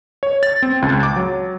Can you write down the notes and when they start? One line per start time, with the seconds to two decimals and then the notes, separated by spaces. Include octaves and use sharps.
0.23 C#5
0.43 A6
0.62 C4
0.82 C#2
1.03 D6
1.16 F#3